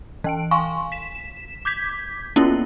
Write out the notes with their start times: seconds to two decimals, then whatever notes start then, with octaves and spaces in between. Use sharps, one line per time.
0.24 E3 G5 D7
0.51 F5 G#5 C6 C#6
0.92 B6 E7
1.65 D6 G6 G#6 B6
2.36 A#3 B3 C#4 E4 F4